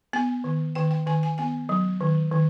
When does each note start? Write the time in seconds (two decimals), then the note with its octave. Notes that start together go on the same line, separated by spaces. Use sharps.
0.13 B3 G#5
0.44 D#3
0.75 D#3 G5
0.91 G5
1.06 D#3 G#5
1.23 G#5
1.38 B3 G#5
1.69 F#3
2.01 D#3
2.31 D#3